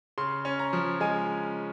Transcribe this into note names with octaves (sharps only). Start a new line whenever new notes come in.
C#3 C6
C#4
A#5
F3
G#3 G#5